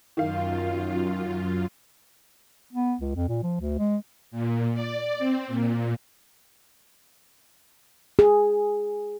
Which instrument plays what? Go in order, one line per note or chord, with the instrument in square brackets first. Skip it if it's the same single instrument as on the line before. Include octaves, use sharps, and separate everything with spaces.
[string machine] F#2 F4 [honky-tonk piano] D#3 F5
[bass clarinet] B3
C#2
F2
A#2
F3
D2
G#3
[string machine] A#2
D5
C4
A#2
[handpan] G#4